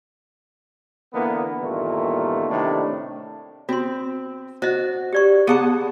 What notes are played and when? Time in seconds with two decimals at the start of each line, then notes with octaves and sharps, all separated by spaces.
1.14 D3 E3 A#3 B3
1.61 E2 G2 A#2 D#3 A3
2.49 A2 C3 D#3 D4
3.69 C4 F#4 C6
4.62 F#4 C5 D#5
5.13 G4 D5 C#6
5.47 B3 G#4 F#5 A5 C#6 D6